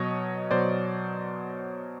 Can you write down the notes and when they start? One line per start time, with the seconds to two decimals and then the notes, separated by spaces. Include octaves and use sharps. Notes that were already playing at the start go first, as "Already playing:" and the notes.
Already playing: B2 F#3 C#5 D#5
0.51 B2 F#3 C5 D5